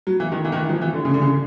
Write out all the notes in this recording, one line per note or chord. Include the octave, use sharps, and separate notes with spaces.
F#3
E3
D#3
E3
D#3
E3
F3
E3
D3
C#3
D3
C#3